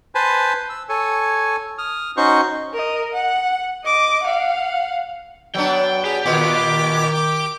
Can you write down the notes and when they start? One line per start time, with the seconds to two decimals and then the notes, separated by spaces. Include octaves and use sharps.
0.15 B4 C5 G#5 A5 B5
0.69 E6
0.89 A4 C#5 G#5
1.78 D#6 F6
2.17 C#4 D#4 F#4 C5 C#6
2.74 A#4 D#5
3.13 F#5
3.84 D#5 D6
4.23 F5 F#5
5.54 F#3 B3 D4 G5
6.04 G4 G#4
6.26 A#2 D#3 B3 F4 D6
6.60 D#3
7.15 D6